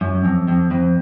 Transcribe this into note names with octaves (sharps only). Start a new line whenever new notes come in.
F#2
F2
F2
F2